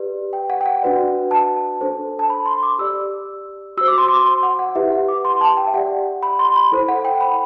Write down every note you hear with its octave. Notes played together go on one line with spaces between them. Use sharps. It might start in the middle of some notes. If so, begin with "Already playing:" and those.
Already playing: G4 B4 D5
G5
F#5
G5
F#5
D4 F#4 B4 D5
A5
D4 A4 C5
A5
B5
C6
D6
G4 D5 E6
F#4 C5 E6
D6
C6
D6
C6
F#5
F#5
E4 G4 B4 E5
F#5
D6
C6
A5
G5
E5
G4 D5 F#5
B5
C6
B5
E4 A4 C5
F#5
G5
B5